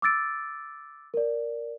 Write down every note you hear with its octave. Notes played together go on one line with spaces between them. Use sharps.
D6 E6 A6 D7
A#4 D5